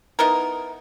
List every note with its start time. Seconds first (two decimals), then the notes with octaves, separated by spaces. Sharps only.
0.19 B3 D#4 E4 A#4